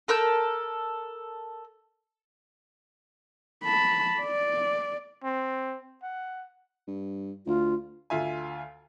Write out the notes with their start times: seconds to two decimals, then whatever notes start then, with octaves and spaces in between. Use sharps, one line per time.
0.08 A4 A#4 E6 G6
3.64 A5 B5
4.21 D5
5.24 C4
6.03 F#5
6.88 G2
7.47 D2 F4
8.10 D2 F4 E5 G#5